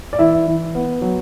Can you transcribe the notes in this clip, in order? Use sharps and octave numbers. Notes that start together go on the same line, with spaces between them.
D5
E3 E4 E5
E3
B3
F#3